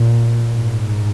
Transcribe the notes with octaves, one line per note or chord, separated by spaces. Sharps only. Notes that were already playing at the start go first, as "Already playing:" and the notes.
Already playing: A#2
G#2